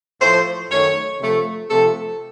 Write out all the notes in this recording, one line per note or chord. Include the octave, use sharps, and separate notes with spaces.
A2 F3 A3 C5
F#2 D#3 A3 C#5
C3 F3 A3
C3 F3 A3 A4